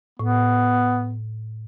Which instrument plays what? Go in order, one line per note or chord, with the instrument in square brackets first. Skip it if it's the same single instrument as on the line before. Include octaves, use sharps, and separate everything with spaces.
[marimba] A2 [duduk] B3